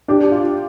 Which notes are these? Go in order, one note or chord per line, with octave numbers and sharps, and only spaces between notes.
D4 G4
F4